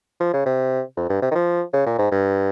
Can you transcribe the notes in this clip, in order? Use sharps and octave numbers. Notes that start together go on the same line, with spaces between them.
F3
C#3
C3
F2
G2
C3
D#3
F3
C#3
A#2
G#2
G2